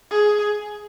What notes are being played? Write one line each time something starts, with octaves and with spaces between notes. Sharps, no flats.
G#4